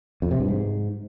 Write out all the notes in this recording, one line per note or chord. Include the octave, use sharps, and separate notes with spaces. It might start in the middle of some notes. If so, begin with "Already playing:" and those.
F2
C3
G2
G#2